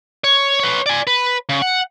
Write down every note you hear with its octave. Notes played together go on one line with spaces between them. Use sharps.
C#5
B4 C#5
D5 G#5
B4
C#3
F#5